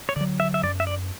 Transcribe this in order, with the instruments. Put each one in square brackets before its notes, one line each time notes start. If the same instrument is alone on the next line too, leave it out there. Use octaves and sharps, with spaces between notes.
[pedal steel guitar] C#5
[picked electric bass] D3 F#3 [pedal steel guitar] D5
[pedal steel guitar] E5
E5
[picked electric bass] F#2 [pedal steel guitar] D5
[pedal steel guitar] E5
D5